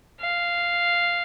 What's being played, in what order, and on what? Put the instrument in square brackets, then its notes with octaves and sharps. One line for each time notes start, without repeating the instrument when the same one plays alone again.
[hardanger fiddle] F5